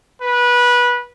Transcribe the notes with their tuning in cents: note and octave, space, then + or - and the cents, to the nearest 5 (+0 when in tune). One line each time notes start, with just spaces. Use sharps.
B4 -20